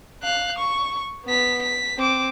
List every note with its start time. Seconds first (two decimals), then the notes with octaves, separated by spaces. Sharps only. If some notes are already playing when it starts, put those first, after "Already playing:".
0.22 F5 F#6
0.58 C#6
1.25 B3 B6
1.61 B6
1.98 C4 D6